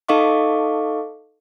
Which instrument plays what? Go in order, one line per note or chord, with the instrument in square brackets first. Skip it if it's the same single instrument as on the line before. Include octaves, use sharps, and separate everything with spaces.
[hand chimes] D#4 A4 D#5 F5 C#6 D6